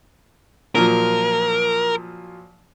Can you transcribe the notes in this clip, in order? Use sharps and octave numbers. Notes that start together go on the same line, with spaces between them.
A#2 F3 F#3 A#4